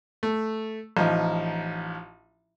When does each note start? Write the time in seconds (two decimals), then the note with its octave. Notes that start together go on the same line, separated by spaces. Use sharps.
0.23 A3
0.97 A1 F3 D#4